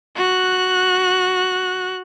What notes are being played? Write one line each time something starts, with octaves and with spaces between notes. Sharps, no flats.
F#4 F#6